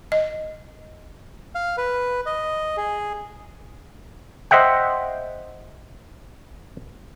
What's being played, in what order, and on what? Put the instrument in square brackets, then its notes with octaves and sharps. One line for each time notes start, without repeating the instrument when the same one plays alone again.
[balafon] D#5
[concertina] F5
B4
D#5
G#4
[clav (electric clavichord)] C5 D#5 E5 F#5 G5